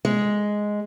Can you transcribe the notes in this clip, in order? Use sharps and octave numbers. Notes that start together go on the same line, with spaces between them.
G#3